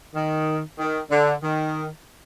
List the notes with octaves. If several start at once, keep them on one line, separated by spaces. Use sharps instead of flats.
D#3
D#3
D3
D#3